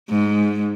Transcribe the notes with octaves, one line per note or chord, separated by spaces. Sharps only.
G#2